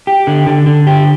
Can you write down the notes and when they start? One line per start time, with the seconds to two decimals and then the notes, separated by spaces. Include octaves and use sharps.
0.07 G4
0.27 D3
0.47 D3
0.67 D3
0.87 G4